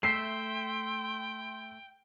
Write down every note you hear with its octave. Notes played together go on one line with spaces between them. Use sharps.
A3 E5 G5 C6 C7